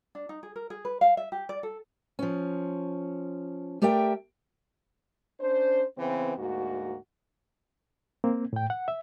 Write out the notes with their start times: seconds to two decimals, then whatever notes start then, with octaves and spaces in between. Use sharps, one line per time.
0.15 D4
0.29 D#4
0.43 G#4
0.56 A#4
0.70 G#4
0.85 B4
1.01 F5
1.17 E5
1.32 G4
1.49 D5
1.63 A4
2.19 F3 C#4
3.82 A3 G4 A#4 D5 E5 G5
5.40 C#4 D4 C5
5.97 C#3 E3 B3 C4
6.38 D2 G#2 A#3 F#4
8.24 A#3 C4
8.53 A2 G5
8.70 F#5
8.88 E5